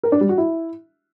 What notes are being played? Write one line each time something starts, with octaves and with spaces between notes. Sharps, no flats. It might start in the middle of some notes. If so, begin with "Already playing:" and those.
A#4
D4
G3
F#4
E4